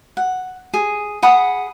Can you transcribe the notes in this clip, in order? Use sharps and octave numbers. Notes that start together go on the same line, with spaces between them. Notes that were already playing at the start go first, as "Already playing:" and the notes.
F#5
G#4
G#4 F#5 B5 D#6